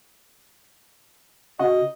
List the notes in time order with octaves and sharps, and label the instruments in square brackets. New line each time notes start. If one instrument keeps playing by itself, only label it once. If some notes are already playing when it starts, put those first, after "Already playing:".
[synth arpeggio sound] C#3 F#4 [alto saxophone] D#5